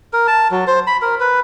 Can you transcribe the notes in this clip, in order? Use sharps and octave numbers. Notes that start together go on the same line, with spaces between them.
A#4
A5
F#3
C5
B5
A#4
B4